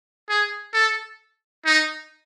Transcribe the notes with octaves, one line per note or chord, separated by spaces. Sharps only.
G#4
A4
D#4